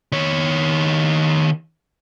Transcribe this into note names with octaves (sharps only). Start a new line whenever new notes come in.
D#3 C#5